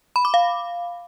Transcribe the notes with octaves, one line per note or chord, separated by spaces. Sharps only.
B5
D6
F5